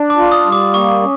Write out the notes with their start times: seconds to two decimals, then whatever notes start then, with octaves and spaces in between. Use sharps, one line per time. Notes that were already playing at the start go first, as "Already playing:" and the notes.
Already playing: D4
0.10 D6
0.17 F4
0.32 D#6
0.46 G3
0.52 D6
0.74 A#3 C#6
1.01 C#4